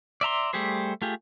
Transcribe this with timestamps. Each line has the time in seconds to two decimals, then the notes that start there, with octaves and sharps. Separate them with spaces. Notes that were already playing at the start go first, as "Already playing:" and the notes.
0.21 D5 E5 A#5 C6
0.53 G3 A3 G4 G#4 C5
1.02 A3 F4 G4 G#4